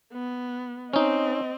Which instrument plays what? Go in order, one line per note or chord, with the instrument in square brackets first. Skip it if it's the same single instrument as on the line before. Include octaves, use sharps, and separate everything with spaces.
[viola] B3
[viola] C4 D#5 [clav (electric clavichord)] C#4 D#4